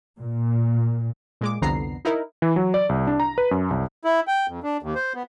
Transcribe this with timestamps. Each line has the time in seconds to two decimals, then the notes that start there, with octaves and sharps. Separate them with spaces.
0.19 A#2
1.41 A#2 G#3 D6
1.62 C2 F2 D3 B3 A#5 C7
2.05 D#4 E4 A#4
2.42 E3
2.56 F#3
2.74 D5
2.89 C2
3.07 D4
3.20 A#5
3.38 B4
3.51 F#2
3.71 C2
4.05 E4
4.27 G5
4.48 F2
4.63 D4
4.82 D#2
4.95 C5
5.15 B3